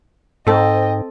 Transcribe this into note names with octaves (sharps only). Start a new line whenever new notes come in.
G#2 C4 A4 D#5 G5